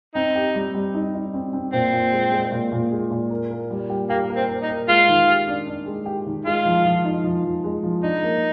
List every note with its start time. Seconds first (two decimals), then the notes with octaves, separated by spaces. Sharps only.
0.15 C4 D#4
0.35 G4
0.55 G3
0.74 G3
0.94 D#4
1.14 D#4
1.34 C4
1.53 C4
1.73 A#2 C4
1.93 A#2
2.12 G#3
2.31 G#3
2.52 A#2
2.72 A#2
2.91 G#3
3.10 A#2
3.30 A#4
3.50 A#4
3.70 G3
3.90 G4
4.10 A#3 G4
4.30 A#4
4.36 C4
4.48 A#4
4.62 D#4
4.69 A#4
4.88 G#3 F4
5.08 D#3
5.27 G4
5.47 D4
5.67 D4
5.86 G#3
6.06 G4
6.26 D#3
6.45 G#3 F4
6.65 F3
6.85 F3
7.05 D#4
7.24 F3
7.44 F3
7.64 G#3
7.83 F3
8.02 D4 D#4
8.22 A#3